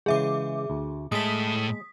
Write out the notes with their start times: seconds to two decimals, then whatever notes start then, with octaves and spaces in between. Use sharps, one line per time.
0.06 C#3 E3 G#3 G#4 E5 D6
0.70 D2
1.12 A2 G#3 A4 D#6 B6